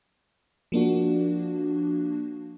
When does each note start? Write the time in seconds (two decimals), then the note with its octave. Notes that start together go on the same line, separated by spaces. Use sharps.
0.72 F3 A#3 D4 F#4